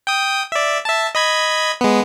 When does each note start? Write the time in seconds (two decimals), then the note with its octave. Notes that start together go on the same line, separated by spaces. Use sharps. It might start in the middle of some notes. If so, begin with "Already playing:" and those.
0.07 G5 D#6
0.52 D5 E5
0.85 E5 A5
1.15 D#5 B5 G#6
1.81 G#3 B3